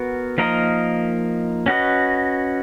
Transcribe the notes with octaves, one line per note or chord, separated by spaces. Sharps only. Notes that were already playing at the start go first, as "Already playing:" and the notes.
Already playing: B3 F#4 A#4
F3 A#3 D#4 A#4 D#5
C#4 F#4 B4 D#5